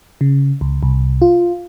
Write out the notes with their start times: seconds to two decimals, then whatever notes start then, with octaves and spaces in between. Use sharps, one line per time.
0.21 C#3
0.61 C#2
0.83 C2
1.22 F4